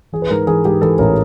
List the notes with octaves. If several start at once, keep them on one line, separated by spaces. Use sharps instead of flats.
E3 G#4
B4
G#2 A#4
E3 G#4
G#2 G4
E3 A4
A1 A#4